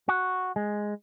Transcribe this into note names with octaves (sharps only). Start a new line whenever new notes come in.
F#4
G#3